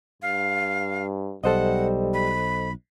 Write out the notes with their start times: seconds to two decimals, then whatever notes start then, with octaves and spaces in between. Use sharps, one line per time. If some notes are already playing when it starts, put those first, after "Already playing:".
0.22 G2 F5
1.44 B1 G3 A4 C5 D#5 F#5
2.14 B5